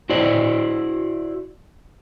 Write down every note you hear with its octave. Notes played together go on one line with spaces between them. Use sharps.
E4 F#4 C5 D5